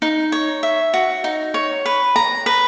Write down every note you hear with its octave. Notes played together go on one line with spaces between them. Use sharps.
D#4
C#5
E5
F#4
D#4
C#5
B4
A#5
B4